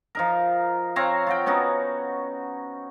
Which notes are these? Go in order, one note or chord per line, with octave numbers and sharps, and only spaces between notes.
F3 D#4 A#4
C4 C#5 F5 A#5
F4 F#5 G5
B3 C#4 D#4 F#4